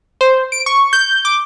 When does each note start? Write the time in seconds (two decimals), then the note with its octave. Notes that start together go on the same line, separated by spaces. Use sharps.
0.21 C5
0.52 D7
0.66 C#6
0.93 G6
1.25 D6